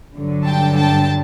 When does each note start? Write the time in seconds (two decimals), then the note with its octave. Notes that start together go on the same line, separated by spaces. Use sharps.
0.15 G2 D3 F#3
0.46 G5 A5
0.77 G5 A5